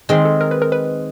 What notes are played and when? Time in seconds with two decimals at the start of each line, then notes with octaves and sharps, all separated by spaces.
0.09 D#3 G#3 C4 G#4
0.25 A4
0.41 A#4
0.51 B4
0.62 A#4
0.72 B4